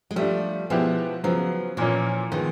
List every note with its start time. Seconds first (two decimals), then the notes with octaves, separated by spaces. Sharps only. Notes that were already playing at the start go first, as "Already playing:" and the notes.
0.11 G#3
0.16 F3 G3 A3 D4
0.70 B2 F3 G#3 B3 E4 G4
1.24 C#3 F3 F#3 B3
1.77 A#2 E3 F3 A#3 C#4
2.32 D#3 F3 G#3 B3